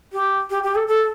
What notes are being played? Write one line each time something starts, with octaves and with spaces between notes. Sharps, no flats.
G4
G4
G4
A4
A4